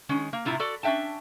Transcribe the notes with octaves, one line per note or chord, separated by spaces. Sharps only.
D#3 G#3 C#4 G#4
A#3
A2 C3 E4 F4 A#5
F#4 A4 D5
C#4 D4 E5 G5 A5